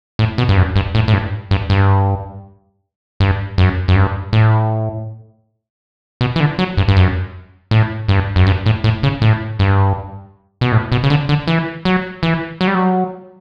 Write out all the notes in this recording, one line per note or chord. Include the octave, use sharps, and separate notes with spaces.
A2
B2
G2
F#2
G2
A2
A2
G2
G2
G2
G2
F#2
F#2
G2
A2
B2
E3
D3
F#3
G2
G2
F#2
A2
G2
F#2
G2
A2
A2
C#3
A2
G2
B2
A2
B2
C#3
D3
D3
E3
F#3
E3
F#3
G3
F#3